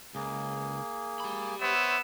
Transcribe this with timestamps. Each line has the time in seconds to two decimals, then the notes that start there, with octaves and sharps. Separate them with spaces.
0.15 C#2 A#3 G#4
1.20 G4 B5
1.61 B3 C5 C#5 E5 E6